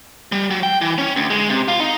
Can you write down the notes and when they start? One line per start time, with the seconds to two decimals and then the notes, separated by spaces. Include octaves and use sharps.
0.32 G3
0.50 F#3
0.63 G5
0.81 E3
0.98 C#4
1.16 D2
1.30 G#3
1.49 C3
1.68 F4
1.80 D#4